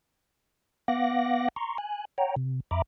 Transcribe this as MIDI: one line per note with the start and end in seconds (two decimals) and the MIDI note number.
0.88 1.48 59
0.88 1.48 77
0.88 1.48 78
0.88 1.48 86
0.88 1.48 90
0.88 1.48 94
1.56 1.77 82
1.56 1.77 84
1.56 1.77 85
1.78 2.05 80
1.78 2.05 90
2.18 2.35 73
2.18 2.35 78
2.18 2.35 79
2.18 2.35 82
2.36 2.60 48
2.71 2.82 41
2.71 2.82 76
2.71 2.82 82
2.71 2.82 83
2.71 2.82 86